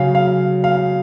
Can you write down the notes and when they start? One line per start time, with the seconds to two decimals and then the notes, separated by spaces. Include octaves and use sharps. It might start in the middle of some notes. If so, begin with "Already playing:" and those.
Already playing: C#3 F#3 C#4 F5
0.15 F5
0.64 F5